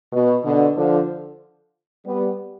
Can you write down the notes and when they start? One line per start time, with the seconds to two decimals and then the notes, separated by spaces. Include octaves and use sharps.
0.12 B2
0.44 B2 D3
0.76 D3 F3
2.05 G3 B3